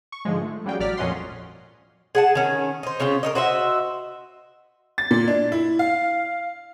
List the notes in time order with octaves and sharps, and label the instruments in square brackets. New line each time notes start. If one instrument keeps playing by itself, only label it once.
[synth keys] C#6
G#2 D3 F3 G#3
A3
G3 C#4 F#4 G#4 F5 G5
A1 F#3 D5 F6 B6
F2 A#2 C#4 D#5 F#5 C6
[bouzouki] G#4 F#5 A5
D#3 C#4
D#4 C5
C#3 C#4 F4 G5
A#4 C#5 D#5
F#4 C5 D#5 E5
[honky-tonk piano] A6
A#2
D4
E4
F5